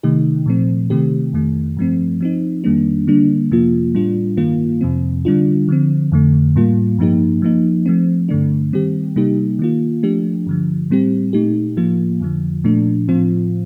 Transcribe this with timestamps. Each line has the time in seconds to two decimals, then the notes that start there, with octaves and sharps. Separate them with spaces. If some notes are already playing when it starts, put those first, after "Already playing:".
0.03 C3 D#3 A3 D#4 G4
0.46 A#2 F3 A3 C4
0.90 C3 D#3 A3 C4 G4
1.33 F2 D#3 A3
1.77 G2 F3 A3 C4
2.21 F3 C4 D#4
2.64 F2 D#3 G3 A#3 D4
3.07 D3 G3 A#3 D4
3.51 F2 C3 F3 A#3 F4
3.95 A2 G3 D4 F4
4.37 G2 D#3 A#3 F4
4.81 F2 C3 F3 C4
5.25 D3 G3 D4 F4
5.68 D3 F3 C4
6.12 F2 D3 A3
6.56 A2 G3 A#3 F4
6.98 G2 F3 A#3 D#4 G4
7.42 F3 A#3 D#4
7.86 F3 A3 C4
8.29 G2 D3 A3 D4
8.73 D#3 G3 C4 G4
9.16 C3 G3 A#3 D#4 G4
9.59 D#3 A#3 F4
10.03 F3 A3 D4 G4
10.47 G2 D3 F3
10.90 A2 G3 C4 G4
11.33 A#2 A3 D#4 G4
11.77 A2 F3 A#3 F4
12.20 F2 D3 F3
12.64 A#2 F3 A3 D4
13.08 A2 F3 C4 F4